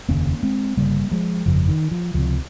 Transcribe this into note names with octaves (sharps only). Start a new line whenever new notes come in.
F1 D#2 C#3 A#3 C#4
G#3 C4
G1 F2 C#3 G3 A#3
F3 G#3
G1 F2 C#3 F3
D#3
F3
C#2 C3 F3